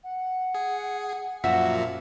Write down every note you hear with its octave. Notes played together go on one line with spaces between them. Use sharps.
F#5
G#4
F#2 A#2 F3 F#4 E5